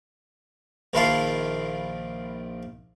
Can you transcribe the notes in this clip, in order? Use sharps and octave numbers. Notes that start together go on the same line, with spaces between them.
A#1 D#3 E4 F4 F5 A5